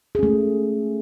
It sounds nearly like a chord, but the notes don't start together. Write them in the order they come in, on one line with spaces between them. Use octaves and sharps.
G#4 C#4 A3